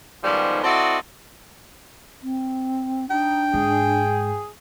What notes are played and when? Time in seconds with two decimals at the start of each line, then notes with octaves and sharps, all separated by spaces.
0.24 G#2 D#3 F3 G3 B3 C#4
0.63 C4 E4 F#4 A4 D5 D#5
2.23 C4
3.10 D4 D#4 G5
3.54 G#2 G#4